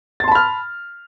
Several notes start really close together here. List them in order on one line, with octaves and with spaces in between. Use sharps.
A6 C6 A5 B5 F6